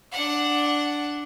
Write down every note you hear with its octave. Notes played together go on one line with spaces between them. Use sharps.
D4 F#5